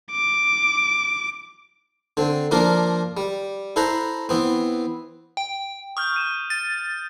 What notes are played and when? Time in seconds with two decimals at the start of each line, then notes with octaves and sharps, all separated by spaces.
0.11 D6
2.17 D3 C4
2.51 F3 A#3 D4 F4 A#4
3.17 G3
3.76 E4 A4 C5 F#5 A#5
4.29 E3 B3 C4
5.37 G5
5.97 C#6 D#6 F6 G6
6.16 D#7 E7
6.50 A6 D#7